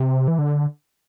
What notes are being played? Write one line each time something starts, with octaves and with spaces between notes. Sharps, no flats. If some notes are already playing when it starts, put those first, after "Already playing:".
Already playing: C3
E3
D3